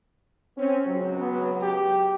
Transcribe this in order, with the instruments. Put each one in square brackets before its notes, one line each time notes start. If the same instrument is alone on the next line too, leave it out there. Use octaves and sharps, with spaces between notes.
[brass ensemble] C4 C#4
C#2 F#3
[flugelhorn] B3
G4